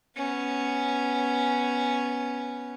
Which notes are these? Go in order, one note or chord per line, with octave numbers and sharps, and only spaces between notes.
B3 C#4